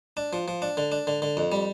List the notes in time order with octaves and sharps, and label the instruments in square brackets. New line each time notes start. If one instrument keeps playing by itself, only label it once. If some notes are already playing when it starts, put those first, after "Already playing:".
[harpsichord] D4
F3
F3
D4
D3
D4
D3
D3
F2
G3